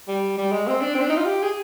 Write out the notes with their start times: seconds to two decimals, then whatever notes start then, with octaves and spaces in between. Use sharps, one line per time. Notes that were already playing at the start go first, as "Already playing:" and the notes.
0.08 G3
0.38 G3
0.52 G#3
0.67 C4
0.82 D4
0.95 C4
1.02 D4
1.10 D#4
1.17 F4
1.25 G4
1.43 G#4